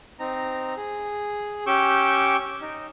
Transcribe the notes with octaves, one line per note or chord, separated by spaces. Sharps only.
C4 D#4 A#5
G#4
C#4 G4 C#6 D6 E6 G6
D#4